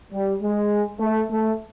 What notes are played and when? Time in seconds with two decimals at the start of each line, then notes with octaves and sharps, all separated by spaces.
0.12 G3
0.42 G#3
1.00 A3
1.30 A3